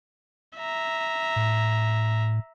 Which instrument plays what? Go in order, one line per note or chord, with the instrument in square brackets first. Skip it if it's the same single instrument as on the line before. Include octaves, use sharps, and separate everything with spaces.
[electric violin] E5 A#5
[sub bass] A2